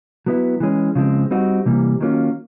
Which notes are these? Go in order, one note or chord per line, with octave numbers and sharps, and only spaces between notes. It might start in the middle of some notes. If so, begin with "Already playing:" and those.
F#3 B3 E4
E3 G#3 C#4
C#3 F3 G#3 C4
G3 C4 D#4 F#4
C3 E3 G3 A#3
D#3 F#3 A#3 C#4 F4